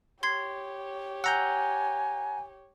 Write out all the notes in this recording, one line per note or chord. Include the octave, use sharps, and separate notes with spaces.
G4 C#5 C6 G#6 C7
F#5 G#5 A#5 E6 G6